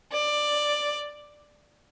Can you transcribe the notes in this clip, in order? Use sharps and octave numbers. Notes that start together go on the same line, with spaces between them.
D5